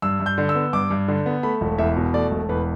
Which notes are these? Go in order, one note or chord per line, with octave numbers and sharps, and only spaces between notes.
G2 E6
G2
G6
D3
E6
B3
G2 D6
G2
D3
B3
A3 B5
E1
E2 E5
B2
A3 D5
E1
E2 B4